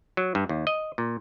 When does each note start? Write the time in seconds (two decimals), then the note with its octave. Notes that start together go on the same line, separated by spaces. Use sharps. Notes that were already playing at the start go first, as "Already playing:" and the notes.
0.17 F#3
0.35 G2
0.49 D#2
0.67 D#5
0.98 A#2